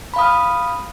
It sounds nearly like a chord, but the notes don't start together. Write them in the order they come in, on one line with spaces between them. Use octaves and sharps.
B5 F5 D#6 F6